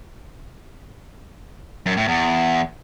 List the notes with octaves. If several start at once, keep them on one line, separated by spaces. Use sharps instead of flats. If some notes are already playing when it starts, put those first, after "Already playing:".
F#2
A2
E2